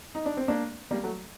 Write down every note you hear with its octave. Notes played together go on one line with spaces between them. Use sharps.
D#4
D4
C4
A#3 D4
G3 A#3
F#3 A3